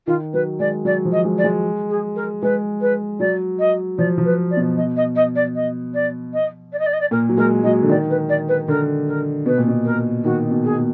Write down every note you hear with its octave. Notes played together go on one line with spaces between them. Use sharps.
D#3 F4
F#3 B4
G#3 D5
F#3 D5
F3
D#5
G#3
D5
G#3
G#4
A#4
G#3 B4
B4
F#3 D5
D#5
F3 D5
F3
B4
D5
B2
D#5
D#5
D#5
D5
D#5
D5
D#5
D5
D#5
D5
D#5
D5
A#2 A#4
F#3
G#3 A#4
F#3 D#5
D3
D#3 D5
B4
D5
B4
D3 A#4
A#4
B2 B4
A#2
B2
A#4
D#3 F#4
B2
G#4
A#2